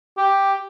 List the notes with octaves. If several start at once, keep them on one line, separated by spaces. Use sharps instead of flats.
G4